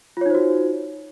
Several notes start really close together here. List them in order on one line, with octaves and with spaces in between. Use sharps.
F4 C#5 D#4 C5 F#4